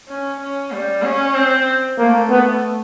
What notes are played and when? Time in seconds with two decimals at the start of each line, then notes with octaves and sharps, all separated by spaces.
0.08 C#4
0.40 C#4
0.72 G3
1.03 C#4
1.35 C4
1.98 A3 A#3
2.30 B3